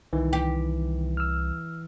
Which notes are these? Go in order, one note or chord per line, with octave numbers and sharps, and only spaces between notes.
C2 D#3 E3
G4
E6 F6